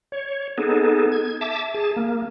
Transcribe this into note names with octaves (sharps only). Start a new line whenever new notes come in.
C#5
B3 D#4 G#4 A4
G#6
E5 A5 D6
G#4 A5
A#3